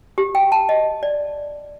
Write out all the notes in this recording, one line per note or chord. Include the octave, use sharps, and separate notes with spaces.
G4
G5
A5
D#5
D5